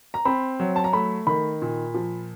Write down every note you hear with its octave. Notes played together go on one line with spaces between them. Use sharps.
A#5
C4 B5
F#3
A5
A#5
A3 B5
D#3 B5
A#2
F3